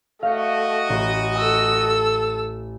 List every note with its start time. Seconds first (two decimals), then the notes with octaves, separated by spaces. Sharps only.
0.22 A3 F#4 D#5 F5 G6 C#7
0.89 A1 C6 F#6
1.38 A4 E6